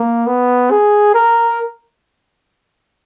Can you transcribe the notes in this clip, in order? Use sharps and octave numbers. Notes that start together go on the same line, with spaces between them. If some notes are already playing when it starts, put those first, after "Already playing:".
Already playing: A#3
B3
G#4
A#4